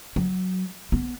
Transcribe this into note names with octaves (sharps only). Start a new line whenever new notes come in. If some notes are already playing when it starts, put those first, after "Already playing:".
F#3
B3